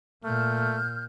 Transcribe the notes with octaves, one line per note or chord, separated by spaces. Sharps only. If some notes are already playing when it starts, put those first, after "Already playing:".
A#2 A3 F6 G6